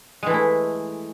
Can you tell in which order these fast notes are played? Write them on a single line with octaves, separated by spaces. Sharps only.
G#3 E3 A3 E4